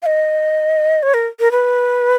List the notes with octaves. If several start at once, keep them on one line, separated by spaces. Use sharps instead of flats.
F5
D#5
C#5
A#4
A#4
B4